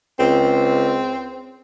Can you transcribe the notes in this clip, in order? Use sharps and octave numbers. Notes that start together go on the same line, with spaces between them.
C#2 C4